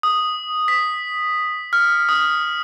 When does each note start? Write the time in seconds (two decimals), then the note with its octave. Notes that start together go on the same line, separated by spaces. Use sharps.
0.03 D#6
0.68 B6
1.73 F6
2.09 D#6